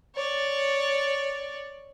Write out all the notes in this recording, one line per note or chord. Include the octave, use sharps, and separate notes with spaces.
C#5 D5